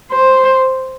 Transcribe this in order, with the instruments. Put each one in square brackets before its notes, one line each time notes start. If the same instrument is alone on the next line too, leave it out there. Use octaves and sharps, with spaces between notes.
[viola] C5